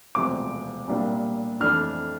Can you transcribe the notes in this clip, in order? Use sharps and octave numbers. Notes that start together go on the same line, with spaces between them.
E1 D2 C3 F3 C4 D6
C2 A#2 G3 A#3 D4
F2 E3 A3 D4 F6